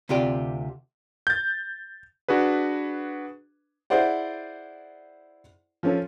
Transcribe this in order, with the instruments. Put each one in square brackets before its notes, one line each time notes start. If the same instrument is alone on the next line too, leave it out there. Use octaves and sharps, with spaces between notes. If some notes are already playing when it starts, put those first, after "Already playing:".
[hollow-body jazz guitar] D2 C3 F4 G4 D5
[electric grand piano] G6 A6
D4 F#4 G#4 B4
[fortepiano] E4 G#4 C5 D5 F#5
F3 C#4 A4